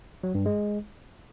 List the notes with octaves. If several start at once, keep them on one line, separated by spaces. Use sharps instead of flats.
F#3
G2
G#3